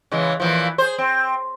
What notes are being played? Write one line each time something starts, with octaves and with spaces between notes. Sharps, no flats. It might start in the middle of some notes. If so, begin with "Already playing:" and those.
C#3 E3 G#3
A#2 E3 F3
G#4 C5
C4